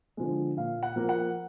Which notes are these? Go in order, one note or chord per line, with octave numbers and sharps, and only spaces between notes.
D3 F3 G#3
A#2 F5
F#5
F3 A#3
F#5